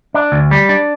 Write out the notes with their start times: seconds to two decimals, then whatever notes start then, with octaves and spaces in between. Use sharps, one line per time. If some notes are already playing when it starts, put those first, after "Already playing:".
0.14 D4
0.32 D2
0.51 G3
0.69 D4